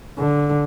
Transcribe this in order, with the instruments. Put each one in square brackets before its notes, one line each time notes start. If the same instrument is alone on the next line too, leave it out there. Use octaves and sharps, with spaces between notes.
[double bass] D3